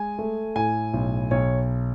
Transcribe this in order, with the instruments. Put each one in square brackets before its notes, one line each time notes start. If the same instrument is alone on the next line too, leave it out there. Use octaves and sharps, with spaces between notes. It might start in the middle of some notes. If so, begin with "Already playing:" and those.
Already playing: [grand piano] G#3 G#5
A3
A2 G#5
B1
B1 C#5